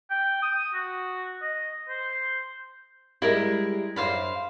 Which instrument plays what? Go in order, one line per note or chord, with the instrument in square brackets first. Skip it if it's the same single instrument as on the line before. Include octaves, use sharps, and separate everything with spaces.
[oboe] G5
D#6
F#4
D#5
C5
[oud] G3 G#3 [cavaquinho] E4 A#4
[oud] F#2 D4 [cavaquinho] C5 F5 B5